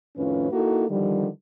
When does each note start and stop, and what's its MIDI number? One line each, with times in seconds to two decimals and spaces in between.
0.17 0.52 41
0.17 0.52 45
0.17 0.52 51
0.17 0.52 61
0.17 0.52 65
0.17 0.52 71
0.52 0.87 58
0.52 0.87 63
0.52 0.87 64
0.52 0.87 66
0.52 0.87 69
0.90 1.27 50
0.90 1.27 51
0.90 1.27 53
0.90 1.27 55